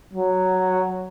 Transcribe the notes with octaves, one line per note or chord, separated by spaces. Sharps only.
F#3